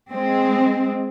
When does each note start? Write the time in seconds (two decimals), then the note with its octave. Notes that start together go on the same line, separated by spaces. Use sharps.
0.12 G#3 C4